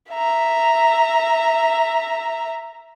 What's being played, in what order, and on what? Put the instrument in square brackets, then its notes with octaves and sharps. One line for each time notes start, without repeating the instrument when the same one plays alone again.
[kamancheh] E5 A#5